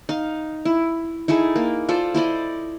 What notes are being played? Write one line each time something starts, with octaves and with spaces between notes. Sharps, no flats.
D#4 F5
E4
D#4 E4 G#4 A4
A#3
F4 A4 C5 D5
E4 C5 D5 D#5